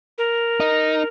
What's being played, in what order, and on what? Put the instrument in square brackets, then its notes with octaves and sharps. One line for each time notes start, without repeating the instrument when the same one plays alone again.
[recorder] A#4
[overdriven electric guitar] D#4